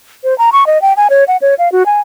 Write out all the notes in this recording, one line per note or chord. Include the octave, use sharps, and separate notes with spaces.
C5
A#5
C#6
D#5
G5
G#5
C#5
F#5
C#5
F5
F#4
G#5